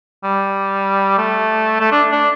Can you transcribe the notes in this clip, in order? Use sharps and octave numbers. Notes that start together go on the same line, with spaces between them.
G3
A3
A3
D4
D4